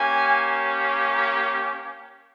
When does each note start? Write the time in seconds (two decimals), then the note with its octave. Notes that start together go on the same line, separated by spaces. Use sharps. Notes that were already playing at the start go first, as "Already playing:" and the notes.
Already playing: A#3 C#4 G4 G#5